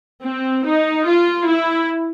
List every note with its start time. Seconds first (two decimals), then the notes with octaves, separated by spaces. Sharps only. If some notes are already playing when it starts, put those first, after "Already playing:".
0.25 C4
0.66 D#4
1.08 F4
1.48 E4